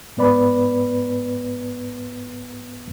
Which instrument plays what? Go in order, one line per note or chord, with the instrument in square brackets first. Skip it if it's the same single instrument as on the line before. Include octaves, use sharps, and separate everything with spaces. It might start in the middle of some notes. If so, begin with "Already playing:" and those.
[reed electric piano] G#2 B3 B4 D5 B5